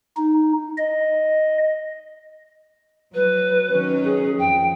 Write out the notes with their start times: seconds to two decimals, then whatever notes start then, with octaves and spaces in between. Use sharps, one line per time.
0.17 D#4
0.77 D#5
3.14 F#3 B4
3.71 D#3 F#3 C#4
4.04 G#4
4.38 F2 F3 G5